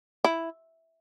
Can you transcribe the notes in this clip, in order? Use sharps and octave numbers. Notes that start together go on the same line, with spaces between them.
E4